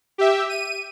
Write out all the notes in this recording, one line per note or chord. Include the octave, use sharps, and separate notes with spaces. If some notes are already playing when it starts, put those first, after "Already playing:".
G4 E5
D#7